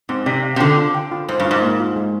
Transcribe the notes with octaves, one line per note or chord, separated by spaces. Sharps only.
G#2 C4
C3 D5
F5
C3
D3 F4
F4
G5
F4
G#2 C5
G2
F4
G#2
A#3
F4
G#3